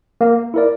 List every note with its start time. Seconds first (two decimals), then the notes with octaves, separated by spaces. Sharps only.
0.21 A#3
0.54 E4 A#4 D5